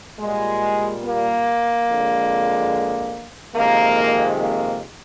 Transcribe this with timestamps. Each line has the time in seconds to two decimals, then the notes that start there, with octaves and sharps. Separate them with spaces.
0.20 A#2 G3 G#3
1.04 A#3
1.87 F2 D3 G#3
3.54 F2 C3 D#3 G#3 A#3
4.38 A#3